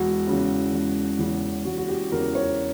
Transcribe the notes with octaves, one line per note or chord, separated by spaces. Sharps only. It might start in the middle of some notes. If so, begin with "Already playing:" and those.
Already playing: E1 F#4
E2 C#3
E1
E2 C#3
E1 F#4
F#4
G4
E2 C#3 A#4
C#5